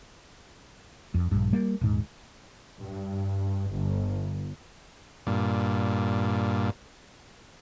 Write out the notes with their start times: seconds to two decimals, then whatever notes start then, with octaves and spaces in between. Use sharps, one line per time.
1.14 F2
1.31 A#1 G2
1.53 G3 A#3
1.81 D#1 G#2
2.82 G2
3.71 G1
5.27 G2 A#2